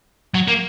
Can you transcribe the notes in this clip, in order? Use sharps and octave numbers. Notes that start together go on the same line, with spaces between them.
F#3
A#3